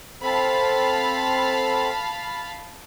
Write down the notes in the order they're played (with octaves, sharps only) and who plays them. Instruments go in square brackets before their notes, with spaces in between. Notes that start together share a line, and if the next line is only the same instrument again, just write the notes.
[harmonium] C4 A4 C5 [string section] F5 A5 B5